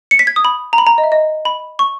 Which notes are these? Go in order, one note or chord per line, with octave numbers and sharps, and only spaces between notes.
C#7
B6
G#6
D#6
B5
A#5
B5
A#5
D#5
E5
D#5
B5
C#6